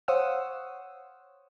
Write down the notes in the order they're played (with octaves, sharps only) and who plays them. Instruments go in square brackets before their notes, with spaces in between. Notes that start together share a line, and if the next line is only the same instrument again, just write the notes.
[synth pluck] C5 C#5 F5 F#5 D#6 E6